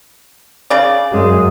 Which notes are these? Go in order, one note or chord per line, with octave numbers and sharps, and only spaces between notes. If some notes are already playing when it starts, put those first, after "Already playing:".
C#3 D5
F#2 G#3